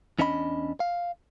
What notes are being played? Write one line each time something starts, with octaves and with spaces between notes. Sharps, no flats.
E2 C#4 D4 D#5 E5 B5
F5